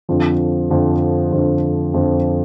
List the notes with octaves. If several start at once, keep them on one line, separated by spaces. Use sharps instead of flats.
F2 D3 F3
F2 D3 F3
F2 D3 F3
F2 D3 F3